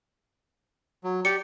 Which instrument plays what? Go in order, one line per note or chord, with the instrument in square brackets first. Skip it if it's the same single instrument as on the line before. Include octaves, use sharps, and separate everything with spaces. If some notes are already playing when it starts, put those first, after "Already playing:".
[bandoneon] F#3
[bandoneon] G4 D5 [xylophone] C#7